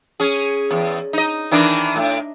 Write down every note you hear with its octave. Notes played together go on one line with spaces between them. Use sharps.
C#4 G#4
E2
D#4 D#5
D#3 E3 D4
A2